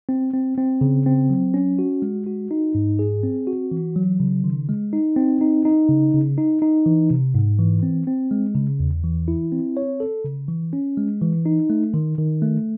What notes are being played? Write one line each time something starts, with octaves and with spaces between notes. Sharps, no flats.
C4
C4
C4
C#3
C4
F#3
C#4
F#4
G#3
F#4
D#4
G#2
G#4
C4
F#4
E3
F#3
C#3
D#3
G#3
D#4
C4
D#4
D#4
C#3
C#3
D#4
D#4
E3
C3
G#2
E3
C4
C4
G#3
C#3
E2
E3
E4
C4
C#5
A4
C#3
E3
C#4
G#3
E3
D#4
A3
D#3
D#3
A3